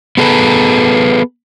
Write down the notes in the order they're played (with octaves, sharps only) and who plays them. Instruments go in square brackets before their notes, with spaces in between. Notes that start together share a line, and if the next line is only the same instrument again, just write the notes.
[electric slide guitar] B3 G#4 A4 B4